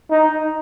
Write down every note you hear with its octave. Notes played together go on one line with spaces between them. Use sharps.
D#4